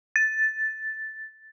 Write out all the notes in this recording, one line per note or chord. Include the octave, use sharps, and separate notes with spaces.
A6